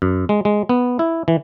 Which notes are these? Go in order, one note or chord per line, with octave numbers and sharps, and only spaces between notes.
F#2
G#3
G#3
B3
E4
E3